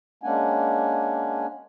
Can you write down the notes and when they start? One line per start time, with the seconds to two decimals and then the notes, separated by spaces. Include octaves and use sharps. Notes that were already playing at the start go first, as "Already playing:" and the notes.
0.23 G#3 A#3 C#4 D4 F#5 G#5